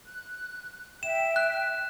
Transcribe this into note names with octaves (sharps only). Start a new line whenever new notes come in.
F#6
E5 G5 E7
F#6